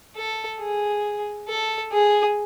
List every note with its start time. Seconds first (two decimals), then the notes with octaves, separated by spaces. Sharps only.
0.16 A4
0.60 G#4
1.48 A4
1.92 G#4